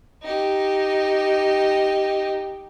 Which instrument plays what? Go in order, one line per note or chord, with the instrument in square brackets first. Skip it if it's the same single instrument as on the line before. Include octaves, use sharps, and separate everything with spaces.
[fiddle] D#4 G4